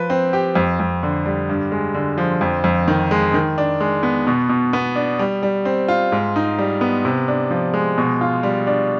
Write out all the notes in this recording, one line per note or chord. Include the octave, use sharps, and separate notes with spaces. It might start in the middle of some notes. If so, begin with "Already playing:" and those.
Already playing: F3 B4
C4
G4
F2
F2
D3
G3
G2
G#3
D3
F3
F2
F2
D#3
G#3
D#3
D4
G#3
B3
B2
B2
B3
D4
G3
G3
C4
F4
G#2
D#4
G3
B3
C3
D4
F3
G#3
B2
F4
G3
D4